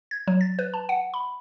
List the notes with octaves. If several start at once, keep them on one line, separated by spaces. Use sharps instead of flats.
G#6
F#3
A6
B4
A5
F#5
B5